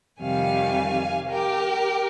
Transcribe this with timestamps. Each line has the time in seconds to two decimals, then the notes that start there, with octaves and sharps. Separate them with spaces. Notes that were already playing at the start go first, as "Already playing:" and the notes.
0.21 F2 C3 D#3 G3 F5 G#5
1.28 G4 A#4